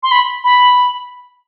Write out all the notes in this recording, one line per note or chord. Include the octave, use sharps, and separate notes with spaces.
C6
B5
B5